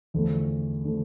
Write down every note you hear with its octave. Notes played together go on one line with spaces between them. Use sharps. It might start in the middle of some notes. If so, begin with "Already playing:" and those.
E2 D3 F3 A3
D3 F3 A3